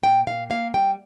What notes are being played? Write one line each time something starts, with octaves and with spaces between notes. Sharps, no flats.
A#2 G5
A#2 F5
A#3 F5
G3 G5